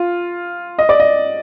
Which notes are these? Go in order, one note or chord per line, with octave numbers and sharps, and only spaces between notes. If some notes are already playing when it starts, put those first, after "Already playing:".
Already playing: F4
D#5
D5
D#5